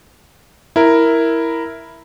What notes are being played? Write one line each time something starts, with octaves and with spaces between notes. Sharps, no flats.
E4 A#4